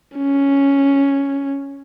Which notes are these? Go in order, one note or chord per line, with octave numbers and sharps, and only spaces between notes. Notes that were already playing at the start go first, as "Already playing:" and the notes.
C#4